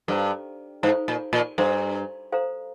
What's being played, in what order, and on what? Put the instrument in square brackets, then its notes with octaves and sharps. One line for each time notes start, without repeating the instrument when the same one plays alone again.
[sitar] G2 [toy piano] A4 C5 F5 A#5
[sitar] G#2 [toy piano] A4 C5 F5 A#5
[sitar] A#2
A#2
[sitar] G2 [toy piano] A4 C5 F5 A#5
[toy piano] A4 C5 F5 A#5